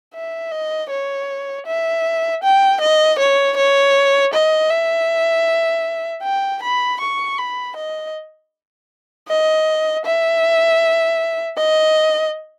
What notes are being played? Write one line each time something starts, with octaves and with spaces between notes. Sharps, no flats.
E5
D#5
C#5
E5
G5
D#5
C#5
C#5
D#5
E5
G5
B5
C#6
B5
D#5
D#5
E5
D#5